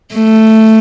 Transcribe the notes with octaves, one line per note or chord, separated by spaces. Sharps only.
A3